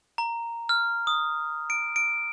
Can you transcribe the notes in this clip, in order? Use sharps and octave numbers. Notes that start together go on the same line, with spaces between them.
A#5
F6
D#6
D7
D7